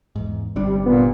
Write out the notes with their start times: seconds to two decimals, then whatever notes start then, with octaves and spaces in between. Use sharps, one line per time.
0.16 E2 G#2
0.56 G1 C3 G3 D4
0.86 A#2 B3